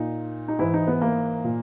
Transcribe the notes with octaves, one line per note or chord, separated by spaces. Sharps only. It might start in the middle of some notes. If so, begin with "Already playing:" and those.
Already playing: A#2 D#4
D#4
G#2 E3 E4
D#4
B3
A#3
A#2